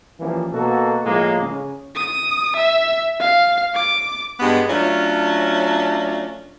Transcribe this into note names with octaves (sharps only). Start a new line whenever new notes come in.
E3 F3 G3 A#3 C#4
B2 A#3 F#4 A4
A2 F3 G#3 A#3
C#3
D#6
E5
F5
D6
G2 G#3 B3
F#3 A3 C#4 D4 F4